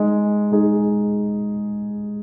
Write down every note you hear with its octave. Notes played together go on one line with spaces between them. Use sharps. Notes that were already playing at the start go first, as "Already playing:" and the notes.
Already playing: G#3 D#4 G#4
G#3 D#4 G#4